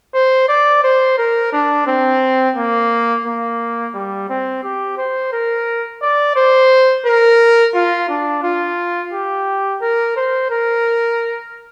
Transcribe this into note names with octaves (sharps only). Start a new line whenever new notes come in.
C5
D5
C5
A#4
D4
C4
A#3
A#3
G3
C4
G4
C5
A#4
D5
C5
A#4
F4
D4
F4
G4
A#4
C5
A#4